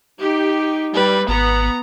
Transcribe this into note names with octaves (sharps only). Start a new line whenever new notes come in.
D#4 G4
G3 B4
G#1 B3 A#5